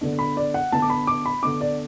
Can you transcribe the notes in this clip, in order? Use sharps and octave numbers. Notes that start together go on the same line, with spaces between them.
D3 B3 D4
B5
D5
F#5
D3 B3 D4 A5
D6
B5
D6
B5
D3 B3 D4 D6
D5